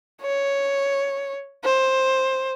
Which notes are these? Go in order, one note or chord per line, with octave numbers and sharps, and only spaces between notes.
C#5
C5